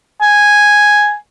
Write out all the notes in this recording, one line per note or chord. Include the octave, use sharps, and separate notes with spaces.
G#5